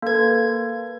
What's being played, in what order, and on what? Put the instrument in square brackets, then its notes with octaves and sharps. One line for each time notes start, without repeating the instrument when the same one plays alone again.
[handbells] A#3 G#6 [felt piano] A4 B4